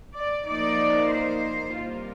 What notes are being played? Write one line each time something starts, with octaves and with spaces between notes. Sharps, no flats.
D5
F3 A#3 D#4 D5
C5
C3 G3 A#3 F4